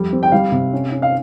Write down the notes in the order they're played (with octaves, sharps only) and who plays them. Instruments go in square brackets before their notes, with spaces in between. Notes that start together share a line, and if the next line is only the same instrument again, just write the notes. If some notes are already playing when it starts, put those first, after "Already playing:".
Already playing: [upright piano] F2 G3
C4
G5
G3 F5
C3
C#4
C#4
F5